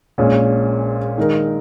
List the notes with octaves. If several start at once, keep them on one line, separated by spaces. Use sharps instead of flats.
A#1 A#2 G#3 C#4
D#3 G#3 D#4 A#4